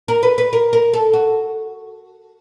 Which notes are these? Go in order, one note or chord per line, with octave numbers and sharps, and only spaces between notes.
A#4
B4
B4
A#4
A#4
A4
F#4